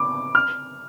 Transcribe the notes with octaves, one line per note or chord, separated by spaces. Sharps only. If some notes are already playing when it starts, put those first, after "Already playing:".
Already playing: D6
F6